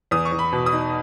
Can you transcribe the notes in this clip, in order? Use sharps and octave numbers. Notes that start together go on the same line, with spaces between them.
E2 D#6
C#6
E2
B5
B2
D#6
D#4